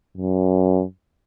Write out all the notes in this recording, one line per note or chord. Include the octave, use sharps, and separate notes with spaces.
F#2